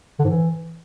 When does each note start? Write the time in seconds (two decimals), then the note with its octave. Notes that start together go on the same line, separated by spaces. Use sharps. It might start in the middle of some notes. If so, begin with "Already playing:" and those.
0.19 D3
0.24 G#2
0.29 E3